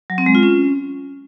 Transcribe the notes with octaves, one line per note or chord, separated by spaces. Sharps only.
F#3
C4
G#3
F4
C#4